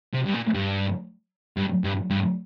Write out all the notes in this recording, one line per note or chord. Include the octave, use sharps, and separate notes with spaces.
C3
G2
A#2
G2
G2
G2
G2